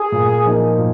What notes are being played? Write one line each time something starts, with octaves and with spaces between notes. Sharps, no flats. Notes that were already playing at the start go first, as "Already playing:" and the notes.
Already playing: G#4
A#2
F3 A#3 D#4
A#2